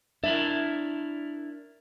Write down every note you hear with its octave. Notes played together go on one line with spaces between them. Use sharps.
D4 E4 A#4 E5